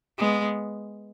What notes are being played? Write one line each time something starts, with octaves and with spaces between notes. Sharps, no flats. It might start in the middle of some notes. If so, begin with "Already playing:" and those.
G#3 B3